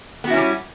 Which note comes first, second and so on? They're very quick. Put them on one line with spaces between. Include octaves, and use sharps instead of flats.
B3 F#4 E4 C#4 G3